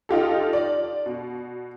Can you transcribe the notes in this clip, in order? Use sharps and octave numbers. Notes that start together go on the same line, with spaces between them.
D#4 F4 G4 A4
D5
B2